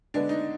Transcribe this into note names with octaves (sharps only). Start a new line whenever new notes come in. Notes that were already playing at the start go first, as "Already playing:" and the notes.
D3 G#3 B3 D4
D#4